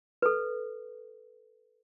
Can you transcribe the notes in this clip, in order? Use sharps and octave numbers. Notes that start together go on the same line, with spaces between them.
A4 B4